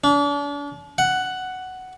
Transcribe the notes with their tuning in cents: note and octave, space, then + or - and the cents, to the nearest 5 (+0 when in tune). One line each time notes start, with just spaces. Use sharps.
D4 -40
F#5 +5